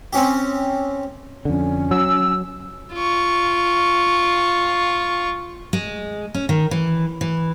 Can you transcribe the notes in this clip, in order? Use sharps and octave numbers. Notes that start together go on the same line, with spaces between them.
C4 C#4 G4
F2 D3 C#4
F#3 E6
F4 C#6
G#3
C#4
D#3
E3
E3